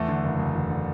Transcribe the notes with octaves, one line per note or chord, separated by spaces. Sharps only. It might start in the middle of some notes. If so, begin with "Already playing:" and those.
Already playing: E2 A3
D3
F#1
F#1
E2
D3